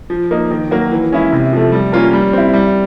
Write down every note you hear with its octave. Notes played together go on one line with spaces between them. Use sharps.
F3
A#3 D#4
D#3
F#3 A#3
E3
G#3 C#4 E4
C3
F3 A3
G3
A#3 C#4 F4 A#4
G3
C4 E4
G3